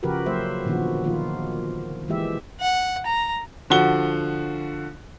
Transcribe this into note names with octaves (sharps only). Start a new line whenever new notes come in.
C#3 F3 F#4 G4 A#4 B4
F#3 A#3 C5 E5
A#2 D3 D#3 F3 B3 F#4
D#3 F3 A#3 F4
E3 G#3 G4 E5
F#5
A#5
D3 F3 F#4 F#5 G7